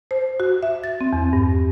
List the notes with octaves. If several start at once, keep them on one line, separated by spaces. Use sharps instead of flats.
C5
F#4
E5
A6
C4
E2
G2